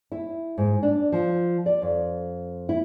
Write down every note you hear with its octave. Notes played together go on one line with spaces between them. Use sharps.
E4
G#2
D4
F3
D5
F2
E4